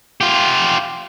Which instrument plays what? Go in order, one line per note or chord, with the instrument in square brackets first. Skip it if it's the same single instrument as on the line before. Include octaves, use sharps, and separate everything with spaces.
[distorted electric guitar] F4 G4